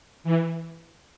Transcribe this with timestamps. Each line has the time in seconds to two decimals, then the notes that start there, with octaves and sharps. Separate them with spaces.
0.24 E3